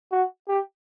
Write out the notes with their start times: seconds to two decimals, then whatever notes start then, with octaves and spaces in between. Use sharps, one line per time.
0.12 F#4
0.48 G4